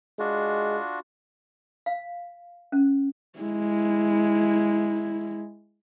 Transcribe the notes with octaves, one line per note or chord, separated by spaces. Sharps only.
G#3 D4 F4 F#4
F5
C#4
G#3 E4